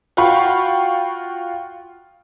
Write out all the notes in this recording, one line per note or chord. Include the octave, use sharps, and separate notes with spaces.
F4 F#4 F5 G5 B5 C#6